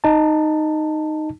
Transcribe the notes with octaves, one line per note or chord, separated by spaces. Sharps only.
D#4 A5